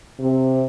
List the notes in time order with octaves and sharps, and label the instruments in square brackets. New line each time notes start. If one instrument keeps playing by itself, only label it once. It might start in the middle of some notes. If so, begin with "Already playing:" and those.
[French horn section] C3